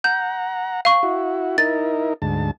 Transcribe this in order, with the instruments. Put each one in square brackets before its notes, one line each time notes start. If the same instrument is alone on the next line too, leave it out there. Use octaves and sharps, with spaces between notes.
[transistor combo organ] F#5 A#5 [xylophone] G6
[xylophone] F5 C#6
[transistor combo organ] E4 F#4
[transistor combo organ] D#4 E4 A#4 [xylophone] A6
[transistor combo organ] D2 G#2 A5